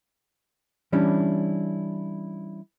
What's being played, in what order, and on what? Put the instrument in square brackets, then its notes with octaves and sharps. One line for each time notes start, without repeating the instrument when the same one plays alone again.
[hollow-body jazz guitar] E3 G3 C#4 D4 E4